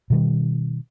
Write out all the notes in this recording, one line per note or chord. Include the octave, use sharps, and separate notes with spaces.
B2 D#3 G3